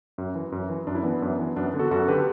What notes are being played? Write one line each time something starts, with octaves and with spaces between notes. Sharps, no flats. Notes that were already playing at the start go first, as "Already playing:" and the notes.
F#2
E3
F#2
E3
F#2 D4
E4
E3 B3 D4
F#2
E3
F#2 B3 D4
D3
F#4 A4
F#2 F#4 A4
D3 G4 B4